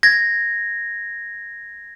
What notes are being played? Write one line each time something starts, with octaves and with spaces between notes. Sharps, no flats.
G#6 A#6